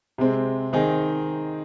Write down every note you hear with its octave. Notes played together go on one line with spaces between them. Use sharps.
C3 G#3 C4
D#3 C4 D#4 G#4